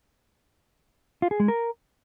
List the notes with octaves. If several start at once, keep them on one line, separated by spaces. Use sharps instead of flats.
F4
G#4
G#3
A#4